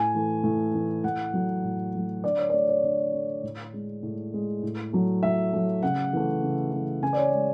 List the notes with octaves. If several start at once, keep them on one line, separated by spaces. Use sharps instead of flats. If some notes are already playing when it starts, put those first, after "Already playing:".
Already playing: A2 G#5
E3 A3
A2
E3 A3
A2 F#5
F#3 A3
A2
F#3 A3
D3 D5
C#5
D5
A3 C#5
C#5
D3
A3
A2
G#3
A2
G#3
A2
F#3 A3
A2 E5
F#3 A3
C#3 F#5
E3 A3
C#3
E3 A3
C#3 G#5
D5
C#5
G#3